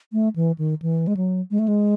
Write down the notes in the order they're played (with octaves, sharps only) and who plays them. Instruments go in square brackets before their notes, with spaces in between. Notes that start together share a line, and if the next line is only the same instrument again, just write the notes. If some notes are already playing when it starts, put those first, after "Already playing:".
[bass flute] A3
E3
D#3
E3
G#3
F#3
G#3
A3
G#3